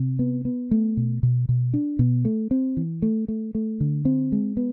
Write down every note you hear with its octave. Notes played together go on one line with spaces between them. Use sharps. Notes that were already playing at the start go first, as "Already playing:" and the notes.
Already playing: C3
B3
B3
A3
B2
B2
B2
D4
B2
A3
C4
E3
A3
A3
A3
D3
C4
G#3
B3